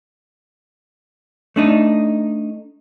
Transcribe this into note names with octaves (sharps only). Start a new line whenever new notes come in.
A3 D4 D#4